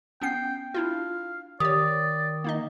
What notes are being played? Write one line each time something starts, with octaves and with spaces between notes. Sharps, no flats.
B3 C#4 G5 C7
D4 E4 F4 F5
D#3 G4 C#5 D5 D#6
A#3 D#4 D#5